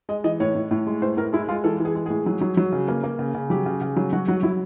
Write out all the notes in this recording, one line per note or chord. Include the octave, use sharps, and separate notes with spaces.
G#3 D#5
E3 D#5
A2 C#5
A2
A2
G#3
A2 C5
A2 A#4
G#3 E4
G#3 F4
E3 A4
E3
G#4
G#3
A2 G#4
F#3
F#3
F#3
C#3
A#3
A#3
C#3
C#3
F#3 G4
C#3
C#3
F#3
F#3 F#4
F#3 F#4
F#3 E4